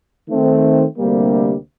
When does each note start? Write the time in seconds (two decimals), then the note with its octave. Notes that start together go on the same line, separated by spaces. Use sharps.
0.28 D#3 A3 C4
0.98 D2 C3 G3 A#3